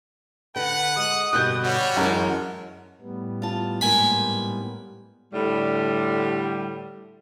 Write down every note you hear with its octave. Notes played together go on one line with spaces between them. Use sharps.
D3 B4 F#5
G#3 D#6
G2 B2 D3 F#6 G6
G3 F#4 C#5
F#2 E3 G#3 D4
A2 G3 B3
F4 A5
G#2 A#3 G4 G#5 B5
A2 D3 G3